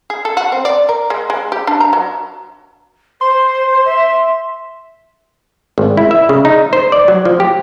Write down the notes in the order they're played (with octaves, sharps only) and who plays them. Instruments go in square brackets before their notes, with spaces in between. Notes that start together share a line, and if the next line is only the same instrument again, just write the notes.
[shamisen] G#4
A4
F#4
C4
D5
A#4
G#3
G#3
G4
D4
A#5
F#3
[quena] C5 [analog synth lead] C6
[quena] E5
[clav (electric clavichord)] G#1
E4
E5
C#3
D#4
C5
D5
F#3
F3
G4